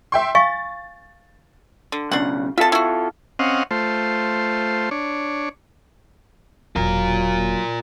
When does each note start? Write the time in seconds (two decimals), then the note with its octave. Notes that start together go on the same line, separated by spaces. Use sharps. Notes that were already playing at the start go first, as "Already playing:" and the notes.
0.12 E5 G5 C6
0.35 F5 G#5 C#6 A6
1.92 D3
2.11 B1 C#3 D4 F#5
2.58 F4 A4 E5 A5
2.72 E4 F#4
3.39 C4 C#4 D#5 F5 F#5
3.71 A3 F4 C5
4.91 D4 C#5
6.76 E1 A#2 F#3 F4 A#4